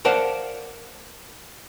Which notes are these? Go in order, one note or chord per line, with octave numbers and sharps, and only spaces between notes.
A#4 C5 D5 F5 F#5 A5